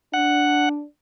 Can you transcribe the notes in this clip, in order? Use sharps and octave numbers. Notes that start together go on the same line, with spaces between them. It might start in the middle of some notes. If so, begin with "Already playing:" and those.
D4 F#5